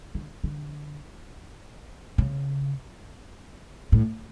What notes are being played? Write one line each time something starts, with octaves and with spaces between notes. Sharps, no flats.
D3
D3
C#3
A2